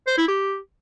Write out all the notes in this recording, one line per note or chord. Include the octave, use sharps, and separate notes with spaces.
C5
E4
G4